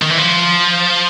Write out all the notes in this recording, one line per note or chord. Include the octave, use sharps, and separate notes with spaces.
D#3
E3
F3